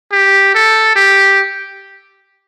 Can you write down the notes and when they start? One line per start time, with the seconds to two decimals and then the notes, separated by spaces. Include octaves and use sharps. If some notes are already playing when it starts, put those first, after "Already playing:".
0.12 G4
0.55 A4
0.96 G4